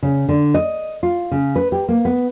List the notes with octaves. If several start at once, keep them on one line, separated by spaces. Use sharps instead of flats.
C#3
D3
D#5
F4
C#3
B4
G4
A#3
B3